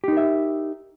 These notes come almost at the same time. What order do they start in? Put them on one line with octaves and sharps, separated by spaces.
G4 D#4 A#4 E5